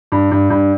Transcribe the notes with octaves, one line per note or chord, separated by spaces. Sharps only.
G2
G2
G2